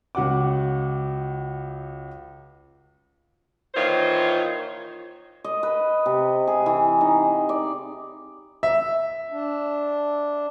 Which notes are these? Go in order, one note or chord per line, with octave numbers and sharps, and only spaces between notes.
C#2 F#4 F#5 D6
A#2 D#3 E3 F4 C5 C#5
D#5
B4
C3
G#4
E3
D#4
D5
E5
D4